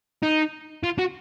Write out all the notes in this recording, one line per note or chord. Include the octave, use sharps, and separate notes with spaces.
D#4
F4
F#4